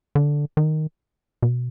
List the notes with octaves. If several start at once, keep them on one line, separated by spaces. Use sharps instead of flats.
D3
D#3
B2